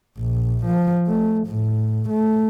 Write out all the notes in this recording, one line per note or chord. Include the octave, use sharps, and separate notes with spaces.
A#1
F3
A3
A2
A3